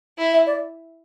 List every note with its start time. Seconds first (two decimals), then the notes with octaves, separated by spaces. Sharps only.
0.18 E4
0.33 E5
0.46 D5